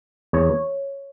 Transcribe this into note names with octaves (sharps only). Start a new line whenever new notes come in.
E2 C#5